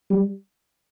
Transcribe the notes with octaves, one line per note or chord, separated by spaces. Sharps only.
G3